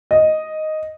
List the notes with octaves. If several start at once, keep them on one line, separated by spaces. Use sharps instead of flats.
D#5